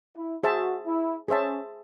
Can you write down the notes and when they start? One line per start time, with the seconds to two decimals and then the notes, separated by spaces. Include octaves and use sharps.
0.15 E4
0.43 F#4 G#4 C5 E5 A5
0.86 E4
1.28 C#4 G#4 C5 E5 A5